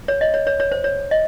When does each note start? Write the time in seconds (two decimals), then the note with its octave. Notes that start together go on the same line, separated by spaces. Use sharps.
0.08 C#5
0.21 D#5
0.34 C#5
0.47 C#5
0.60 C#5
0.72 C5
0.84 C#5
1.11 D#5